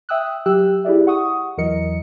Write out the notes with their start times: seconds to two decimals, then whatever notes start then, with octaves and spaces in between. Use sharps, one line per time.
0.09 E5 G5 D#6 E6 F#6
0.46 F#3 G4 G5 E6 F#6
0.85 E4 G4 G#4 D5 E5
1.07 F#5 C#6 D#6
1.57 E2 E3 F#3 A#4 D#5 C#7